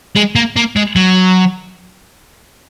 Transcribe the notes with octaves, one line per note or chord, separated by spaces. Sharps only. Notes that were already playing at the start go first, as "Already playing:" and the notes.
G#3
A#3
A#3
G#3
F#3